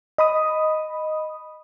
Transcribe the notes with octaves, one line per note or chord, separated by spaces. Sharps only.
D#5 B5 D#6